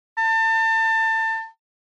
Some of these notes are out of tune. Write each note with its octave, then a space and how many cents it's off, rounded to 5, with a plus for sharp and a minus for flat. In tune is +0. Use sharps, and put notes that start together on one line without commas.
A5 +30